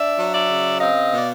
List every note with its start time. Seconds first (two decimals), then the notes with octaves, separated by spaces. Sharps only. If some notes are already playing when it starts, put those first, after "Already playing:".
Already playing: D4 D5 E5
0.19 F#3
0.34 D5 E5
0.50 C#3
0.81 C4 D#5 F5
1.12 B2 D5